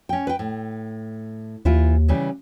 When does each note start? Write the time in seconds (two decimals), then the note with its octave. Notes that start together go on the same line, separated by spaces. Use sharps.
0.09 C#4 G5
0.27 B4 G5
0.39 A2
1.65 D#2 E3 E4 F4
2.08 C#3 E3 G3